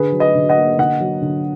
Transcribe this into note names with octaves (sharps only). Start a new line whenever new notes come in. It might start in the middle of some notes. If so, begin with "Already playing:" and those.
Already playing: D3 G#4 B4
F#3
B4 D#5
D3
D#5 F#5
A#3
D3 D#5 F#5
F#3
D3